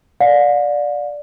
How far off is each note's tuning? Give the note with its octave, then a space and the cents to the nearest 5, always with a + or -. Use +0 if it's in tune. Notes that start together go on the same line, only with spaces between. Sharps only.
D5 +0 F5 +45